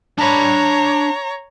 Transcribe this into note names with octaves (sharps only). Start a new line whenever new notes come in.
D4 C#5 A#5 B5